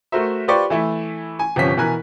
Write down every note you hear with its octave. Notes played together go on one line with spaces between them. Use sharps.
A3 F#4 A#4 C5 E5
F4 G4 B4 C5 D5 C#6
E3 A3 E4
G#5
G1 C3 F3 C#4 B6
B2 E3 A#4 G#5 F#6